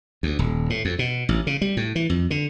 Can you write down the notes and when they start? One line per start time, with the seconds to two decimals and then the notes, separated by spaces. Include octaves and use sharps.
0.23 D2
0.39 D#1
0.70 A2
0.85 F2
0.99 B2
1.29 A1
1.47 C#3
1.62 G3
1.77 A2
1.95 E3
2.10 F2
2.31 D3